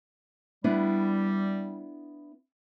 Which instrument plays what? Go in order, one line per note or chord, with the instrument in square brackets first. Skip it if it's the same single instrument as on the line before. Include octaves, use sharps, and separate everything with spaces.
[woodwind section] G3 [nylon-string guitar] B3 D4 E4